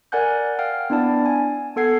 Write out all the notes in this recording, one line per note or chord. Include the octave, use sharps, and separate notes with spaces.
A#4 D5 F#5 G#5 F#6 G6
F5 G5 F6
B3 D4 E4 D5 A5
G#5
B3 A4 F#5 G#6 C7